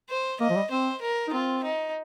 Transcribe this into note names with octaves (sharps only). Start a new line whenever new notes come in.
C5
A#3 D#5
F3
G3
C4 C5
A#4
D#4
C4 F4
D#4